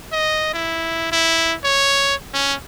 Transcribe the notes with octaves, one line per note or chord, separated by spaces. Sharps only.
D#5
E4
E4
C#5
C#4